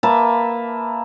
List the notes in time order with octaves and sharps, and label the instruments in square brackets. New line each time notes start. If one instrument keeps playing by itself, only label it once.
[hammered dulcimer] A#3 B4 E5 A5